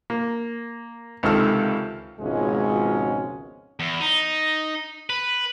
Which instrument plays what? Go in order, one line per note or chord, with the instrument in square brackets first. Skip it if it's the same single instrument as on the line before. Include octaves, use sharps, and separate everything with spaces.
[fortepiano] A#3
C#2 C3 D#3 A4 F6
[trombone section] G#1 C#2 B2 F3 G#3 C#4
[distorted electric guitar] E2
D#4
B4